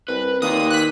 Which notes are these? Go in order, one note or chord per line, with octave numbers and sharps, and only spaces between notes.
C2 B4
D#2 A#4 D5 D#6
F#6 B6